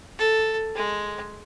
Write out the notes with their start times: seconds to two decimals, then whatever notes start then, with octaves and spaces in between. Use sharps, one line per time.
0.18 A4
0.75 G#3